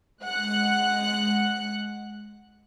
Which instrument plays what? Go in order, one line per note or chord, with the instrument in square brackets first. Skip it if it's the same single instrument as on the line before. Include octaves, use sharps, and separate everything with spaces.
[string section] G#3 F#5 F#6